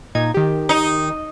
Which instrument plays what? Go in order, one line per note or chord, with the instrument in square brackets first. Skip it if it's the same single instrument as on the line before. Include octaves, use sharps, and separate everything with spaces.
[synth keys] A#2 D#4 G#6
D#3 G4
[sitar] D#4